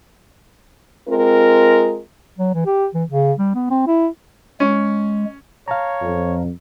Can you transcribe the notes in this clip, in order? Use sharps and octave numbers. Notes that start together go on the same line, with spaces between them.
G#3 C4 F4 A#4
F#3
E3
G4
E3
C#3
G3
B3
C4
E4
G#3 C#4
C#5 F5 A5 A#5
F2